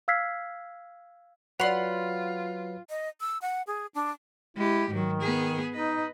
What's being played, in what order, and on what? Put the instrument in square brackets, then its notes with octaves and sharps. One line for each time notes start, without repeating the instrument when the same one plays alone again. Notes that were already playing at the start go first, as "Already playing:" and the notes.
[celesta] F5 E6 F6 G#6 B6 C7
[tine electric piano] F#3 B4 B5 [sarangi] F4 [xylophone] D5 F7 [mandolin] F#5 C6
[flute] D#5
E6
F#5
G#4
D4
[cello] G#3 G4 [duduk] E4
[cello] G#2 F#3 [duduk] D#3
[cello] B3 G#4
[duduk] D#4 [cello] B4 D#5